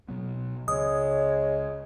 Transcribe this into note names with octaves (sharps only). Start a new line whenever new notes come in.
B2 F#3 B3
C#2 C#3 G#3 C#5 D#6